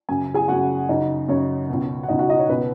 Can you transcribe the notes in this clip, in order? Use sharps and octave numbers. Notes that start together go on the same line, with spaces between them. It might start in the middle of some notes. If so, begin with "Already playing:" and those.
F#2 C#3 G#5
G#4 G#5
F#2 C#3 F#4 F#5
F#2 C#3 D#4 D#5
F#2 C#3 C#5
C#2 B2
F#5
C#2 B2 D#4 D#5
F#4 F#5
D#4 D#5
C#5
C#2 B2 B4